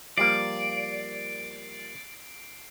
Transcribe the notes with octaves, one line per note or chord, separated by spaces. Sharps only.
F3 G3 A#3 D5 C7 D7